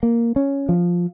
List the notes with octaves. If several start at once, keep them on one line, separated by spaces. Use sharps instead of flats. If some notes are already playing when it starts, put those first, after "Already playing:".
A#3
C#4
F3